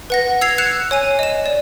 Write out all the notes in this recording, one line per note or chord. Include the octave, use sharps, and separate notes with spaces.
B4 F#5 A#6
E6 G#6 C7 F7
F#6 G#6 C7 C#7 E7 F7
C#5 G#5 D#7
D#5 E7
D5